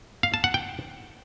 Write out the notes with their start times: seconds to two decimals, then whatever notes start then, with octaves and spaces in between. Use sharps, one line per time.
0.23 F5
0.34 A5
0.44 F#5
0.54 G5